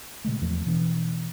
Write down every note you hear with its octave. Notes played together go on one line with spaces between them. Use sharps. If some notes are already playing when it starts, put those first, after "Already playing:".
A#2 C#3 G#3 A3
E2 F3 A3
B2 E3 B3 D4